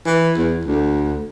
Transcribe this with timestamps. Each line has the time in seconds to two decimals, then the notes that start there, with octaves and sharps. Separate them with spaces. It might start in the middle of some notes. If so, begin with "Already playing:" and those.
0.06 E3
0.37 E2
0.65 D2